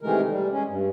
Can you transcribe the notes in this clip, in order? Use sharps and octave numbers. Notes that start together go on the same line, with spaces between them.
C3 D#3 E3 G#3 A3 A#4
G3
G#3 C#4
G2